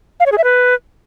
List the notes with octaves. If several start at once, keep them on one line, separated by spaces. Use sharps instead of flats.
F5
C#5
G#4
E5
B4